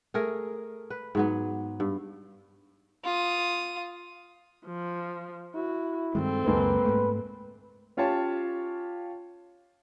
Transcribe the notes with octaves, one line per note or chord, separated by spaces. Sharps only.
A3 G#4 A#4
B4
G#2 F#3 B3
G2
F4 D#6
F3
E4 F#4
G2 D#3 G#3 C4 A4
C#2 F#2 G#3 A#3 B4
G#2 A3
C#4 F4 G4 C#5 F5 A5